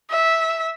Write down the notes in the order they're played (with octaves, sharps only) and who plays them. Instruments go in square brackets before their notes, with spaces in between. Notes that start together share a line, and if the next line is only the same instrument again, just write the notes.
[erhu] E5